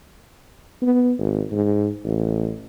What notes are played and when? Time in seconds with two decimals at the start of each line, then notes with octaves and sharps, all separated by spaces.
0.82 B3
1.19 G#1
1.51 G#2
2.04 A1